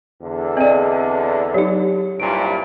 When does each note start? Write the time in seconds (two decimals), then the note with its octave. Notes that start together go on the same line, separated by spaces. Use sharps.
0.22 E2 D3
0.57 C4 G#4 D5 D#5
1.54 F#3 D#4 G4 C#5
2.20 C2 G2 A#2 D7